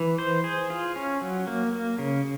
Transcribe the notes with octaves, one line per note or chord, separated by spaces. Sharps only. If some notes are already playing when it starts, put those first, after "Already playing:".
Already playing: E3
C5
G#4
F4
C#4
F#3
A#3
A#3
C#3